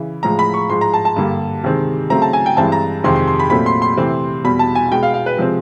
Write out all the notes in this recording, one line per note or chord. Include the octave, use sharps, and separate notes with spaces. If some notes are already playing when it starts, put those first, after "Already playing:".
Already playing: C#3 E3
A2 F3 G#3 A#5
B5
C#6
G#2 F3 G#3 C6
A#5
A5
A5
G2 D3 G3 A#3
C3 D#3 G#3 C4
C#3 F#3 A3 C4 A#5
A5
G#5
G5
G2 E3 G#3 C4 A5
A#5
F2 C3 D#3 G#3 C4 C6
C6
C6
B5
A#2 F#3 A3 C4 B5
C6
C6
C3 E3 A3 C4
E2 B2 G3 B5
A5
G#5
B2 G#3 B3 G5
F5
F5
B4
C3 F3 G#3 C4